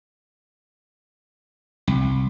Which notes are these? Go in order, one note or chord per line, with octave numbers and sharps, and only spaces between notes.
C2